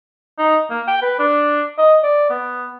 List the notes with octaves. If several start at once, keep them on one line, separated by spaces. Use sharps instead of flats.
D#4
A#3
G5
B4
D4
D#5
D5
B3